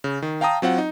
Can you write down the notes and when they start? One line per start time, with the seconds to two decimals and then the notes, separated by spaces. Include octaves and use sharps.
0.04 C#3
0.22 D#3
0.41 F5 G5 A5 A#5 D#6
0.62 F#3 C4 F4 F#5
0.78 D#4